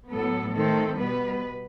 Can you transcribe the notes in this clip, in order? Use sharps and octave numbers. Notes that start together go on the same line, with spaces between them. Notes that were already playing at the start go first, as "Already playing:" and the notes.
A2 F#3 B3 A4
D#3 A3 C4 A4
B2 G3 B3 B4